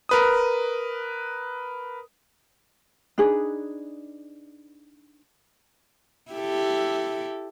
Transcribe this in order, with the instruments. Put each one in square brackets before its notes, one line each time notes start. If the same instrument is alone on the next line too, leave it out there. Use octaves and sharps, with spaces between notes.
[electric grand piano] A#4 B4 D#6
[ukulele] D4 D#4 G#4 B4
[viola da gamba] E4 G4 A4